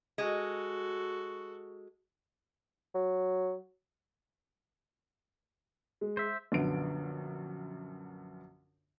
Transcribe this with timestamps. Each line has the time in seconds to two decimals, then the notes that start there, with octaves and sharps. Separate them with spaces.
0.18 G#3 F#4 A4
2.95 F#3
6.01 G#3
6.17 C5 E5
6.52 A#1 F#2 D3 B3 D7